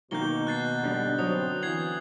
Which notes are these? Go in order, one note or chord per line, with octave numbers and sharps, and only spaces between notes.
B2 D#3 A#3 F#4 G6 G7
F#6 A6 C7
D3 G3 B3
F#3 C4 D#6
E3 G#6 C7 F#7